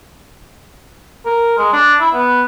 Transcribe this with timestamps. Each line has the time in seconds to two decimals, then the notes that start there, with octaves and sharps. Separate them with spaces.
1.26 A#4
1.58 G#3
1.73 D4
2.00 E4
2.14 B3